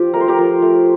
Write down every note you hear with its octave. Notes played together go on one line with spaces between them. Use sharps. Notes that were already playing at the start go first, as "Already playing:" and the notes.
Already playing: F3 F4 G4
A3 A#4
C5
G4 A#4
F3
A3